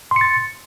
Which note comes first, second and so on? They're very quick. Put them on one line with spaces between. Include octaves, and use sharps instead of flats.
C6 C#7 A6